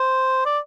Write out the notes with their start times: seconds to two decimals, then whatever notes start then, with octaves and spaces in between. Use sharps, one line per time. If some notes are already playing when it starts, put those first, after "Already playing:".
Already playing: C5
0.46 D5